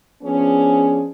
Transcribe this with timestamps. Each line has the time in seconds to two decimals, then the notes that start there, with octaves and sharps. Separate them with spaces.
0.23 F3 B3 C#4 D4 G#4